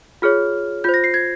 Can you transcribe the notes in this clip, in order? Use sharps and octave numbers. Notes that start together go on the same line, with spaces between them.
F4 G#4 C#5 F6
F4 C5 G6
A#6
C7
G#6